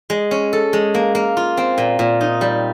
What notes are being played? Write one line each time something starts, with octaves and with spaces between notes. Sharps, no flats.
G#3
C#4
A4
G#3
A#3
A#3
F4
C4
A#2
A#2
D#4
G3